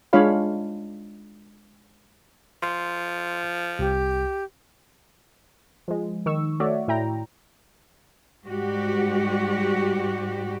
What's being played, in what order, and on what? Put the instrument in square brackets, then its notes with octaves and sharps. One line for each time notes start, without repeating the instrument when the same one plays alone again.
[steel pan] G#3 D4 F4 C#5 F5 B5
[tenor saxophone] F3 [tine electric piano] C6
[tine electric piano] C2 [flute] G4
[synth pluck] F3 G#3
D#3 C#6 E6
A3 F#4 C#5 D5 E5
A2 E4 G5 A#5
[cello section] G#2 G3 F#4 G4